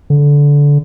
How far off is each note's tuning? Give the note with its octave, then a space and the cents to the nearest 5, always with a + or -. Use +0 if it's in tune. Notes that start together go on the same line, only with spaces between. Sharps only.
D3 -20